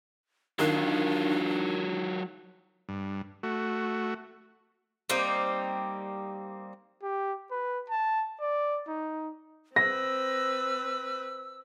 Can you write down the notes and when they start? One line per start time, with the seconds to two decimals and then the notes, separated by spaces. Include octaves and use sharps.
0.59 D#3 F#3 D4 F4
2.89 G2
3.43 A3 F#4
5.10 G3 A#3 C4 D#4
7.03 G4
7.51 B4
7.89 A5
8.40 D5
8.88 D#4
9.76 C4 B4 E6 A#6